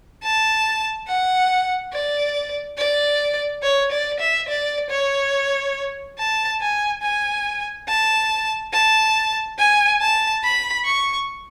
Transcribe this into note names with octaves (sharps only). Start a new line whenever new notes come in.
A5
F#5
D5
D5
C#5
D5
E5
D5
C#5
A5
G#5
G#5
A5
A5
G#5
A5
B5
C#6